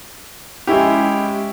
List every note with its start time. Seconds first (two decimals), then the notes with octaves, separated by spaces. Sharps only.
0.67 G#3 C#4 E4 G4